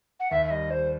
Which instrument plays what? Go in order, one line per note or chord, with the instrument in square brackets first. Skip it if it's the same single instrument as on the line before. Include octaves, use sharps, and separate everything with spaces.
[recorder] F#5
[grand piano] D#2 [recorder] E5
[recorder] E5
[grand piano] G3 [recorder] D#5
[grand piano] G3 [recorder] C5